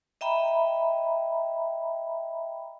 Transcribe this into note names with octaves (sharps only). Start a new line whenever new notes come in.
D#5 E5 G5 A#5 B5